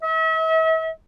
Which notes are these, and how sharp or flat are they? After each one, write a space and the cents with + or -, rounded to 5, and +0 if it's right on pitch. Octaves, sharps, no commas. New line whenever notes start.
E5 -40